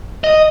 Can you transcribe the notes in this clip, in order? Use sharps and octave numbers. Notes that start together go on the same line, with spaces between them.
D#5